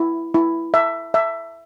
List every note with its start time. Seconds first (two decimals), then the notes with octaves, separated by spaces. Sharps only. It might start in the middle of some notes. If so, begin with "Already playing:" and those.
Already playing: E4
0.34 E4
0.74 E5
1.14 E5